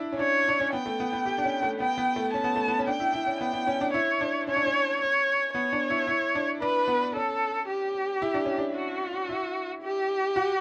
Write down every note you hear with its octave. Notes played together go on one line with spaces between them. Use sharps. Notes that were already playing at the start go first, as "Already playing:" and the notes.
Already playing: D4 E4
C#4
D4 C#5
D4
C#4
B3 G5
A3
B3
B3
G4
D4
C#4
A3
B3 G5
B3
A3
C#4 A5
B3
A3
B3
C#4
D4 G5
E4
E4
C#4
B3 G5
B3
C#4
D4
E4 C#5
D4
C#4 C#5
D4
C#4
C#5
B3 C#5
D4
E4
E4
D4
D4 B4
B3
C#4 A4
G4
E4
D4
C#4
D4
F#4
E4
G4
F#4